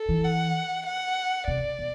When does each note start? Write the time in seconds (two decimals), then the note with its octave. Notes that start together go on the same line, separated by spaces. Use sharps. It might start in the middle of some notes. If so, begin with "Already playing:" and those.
Already playing: A4
0.09 E3
0.24 F#5
0.86 F#5
1.47 C3 D5
1.79 B2